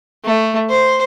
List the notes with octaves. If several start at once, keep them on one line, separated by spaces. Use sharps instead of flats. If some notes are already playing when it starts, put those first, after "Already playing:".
A3
C5